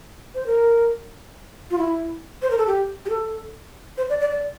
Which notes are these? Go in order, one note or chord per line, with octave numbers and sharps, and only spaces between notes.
C5
A#4
F4
E4
C5
A#4
A4
G4
G4
A4
C5
D5
D5
D5